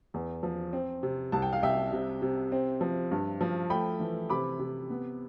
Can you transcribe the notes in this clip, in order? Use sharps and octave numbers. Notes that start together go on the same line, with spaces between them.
E2
F3
C4
C3
C2 A5
G5
F5
C2 E5 G5
C3
C3
C4
F3
G2
F3
A3 G5 B5
E3
C3 B5 D6
C3
B3